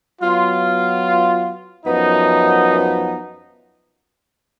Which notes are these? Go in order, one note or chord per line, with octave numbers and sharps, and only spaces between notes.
F#3 B3 F4
F#2 F3 B3 D#4